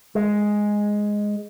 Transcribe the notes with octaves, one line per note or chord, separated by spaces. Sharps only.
G#3